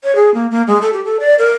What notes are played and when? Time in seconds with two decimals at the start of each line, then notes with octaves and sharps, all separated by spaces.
0.04 C#5
0.16 G#4
0.34 A#3
0.51 A#3
0.67 G#3
0.82 A4
0.93 G4
1.05 A4
1.20 D5
1.39 A#4